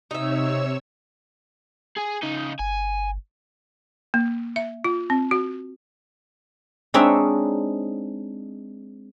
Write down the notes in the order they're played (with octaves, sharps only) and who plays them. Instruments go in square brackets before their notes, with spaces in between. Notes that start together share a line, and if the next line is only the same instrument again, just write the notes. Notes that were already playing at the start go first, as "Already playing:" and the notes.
[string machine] C3 C#5 E6 [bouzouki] D#4 E5
[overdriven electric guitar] G#4 G#5
C#3 D#4
[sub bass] G1 [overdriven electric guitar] G#5
[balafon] A#3
E5
F4
C4
F#4
[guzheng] G#3 C4 D4 D#4 C#5 E5